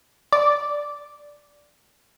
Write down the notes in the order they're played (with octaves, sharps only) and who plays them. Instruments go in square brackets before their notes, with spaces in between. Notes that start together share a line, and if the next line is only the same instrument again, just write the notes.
[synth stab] D5